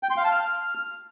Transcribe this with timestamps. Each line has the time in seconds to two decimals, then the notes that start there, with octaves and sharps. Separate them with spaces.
0.03 G5
0.10 C6
0.17 F5
0.24 A5
0.31 F6